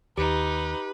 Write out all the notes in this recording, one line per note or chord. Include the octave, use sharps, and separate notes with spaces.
D#2 D#4 G4 B4